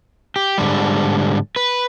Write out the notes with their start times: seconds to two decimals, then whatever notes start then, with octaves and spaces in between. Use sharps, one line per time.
0.36 G4
0.58 G#2 D3 G3
1.56 B4